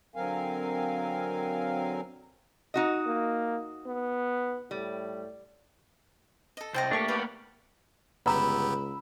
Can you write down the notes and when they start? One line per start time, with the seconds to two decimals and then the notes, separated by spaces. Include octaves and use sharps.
0.16 D3 F#3 C4 A#4 F5 G#5
2.74 D#4 F#4 D#5
3.06 A#3
3.86 B3
4.71 A2 G3
6.57 A4 D#5
6.74 C2 C5 D#5 G5 A5
6.91 A3 A#3 D4 G4 C#6
7.08 A#3 B3 B4 F5 G5
8.26 G1 C#2 B3 G4 B4 A#5 B5 E6